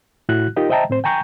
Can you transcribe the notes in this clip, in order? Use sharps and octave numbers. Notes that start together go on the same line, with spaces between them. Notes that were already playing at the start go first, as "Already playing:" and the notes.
A2 E4 F#4 F#6
D#4 F4 G4 A#4 D#5
C5 D#5 E5 G5 A5 A#5
A2 C4 C5
G5 G#5 A#5 C#6 G6